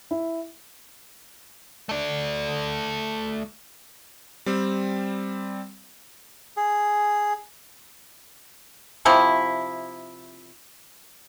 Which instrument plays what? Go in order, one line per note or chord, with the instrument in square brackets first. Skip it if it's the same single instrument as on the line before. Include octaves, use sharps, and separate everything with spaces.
[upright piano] E4
[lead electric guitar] A3 D5
[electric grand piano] G3 C4
[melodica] G#4
[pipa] C3 F3 E4 C#6